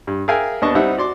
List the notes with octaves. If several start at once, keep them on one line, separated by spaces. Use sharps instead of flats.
G2
G#4 A#4 E5 F5 G5 G#5
D#2 B3 D4 D#5 A5 C#6
G3 C4 D#4 E4 E5 F#5
F#4 D5 C6 D6